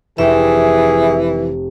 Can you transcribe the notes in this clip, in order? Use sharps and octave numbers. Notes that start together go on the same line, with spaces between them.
F1 E3 G#4 E5 G5